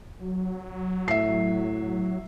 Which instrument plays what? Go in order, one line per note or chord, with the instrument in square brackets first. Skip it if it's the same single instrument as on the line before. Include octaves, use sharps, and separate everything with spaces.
[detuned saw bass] F#3
[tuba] A2 [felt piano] E5 C7